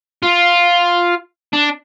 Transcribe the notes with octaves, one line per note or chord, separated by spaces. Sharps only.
F4
D4